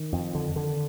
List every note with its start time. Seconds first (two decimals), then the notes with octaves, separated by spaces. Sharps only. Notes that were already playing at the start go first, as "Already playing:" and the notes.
Already playing: D#3
0.12 F2
0.35 D3
0.56 D3